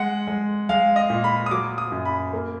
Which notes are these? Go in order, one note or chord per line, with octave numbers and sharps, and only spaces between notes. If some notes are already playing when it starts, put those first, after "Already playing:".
Already playing: G#3 F#5
G#3
G#3 F5
D#5
A#2
B5
D#6
F#3 D6
D#6
F#2
B5
A#3